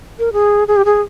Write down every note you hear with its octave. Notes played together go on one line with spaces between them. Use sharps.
A#4
G#4
G#4
G4
G#4